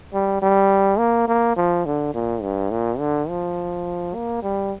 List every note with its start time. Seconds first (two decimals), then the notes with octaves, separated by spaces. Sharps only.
0.14 G3
0.42 G3
0.99 A#3
1.28 A#3
1.56 F3
1.86 D3
2.14 A#2
2.42 G2
2.71 A#2
2.99 D3
3.29 F3
4.15 A#3
4.43 G3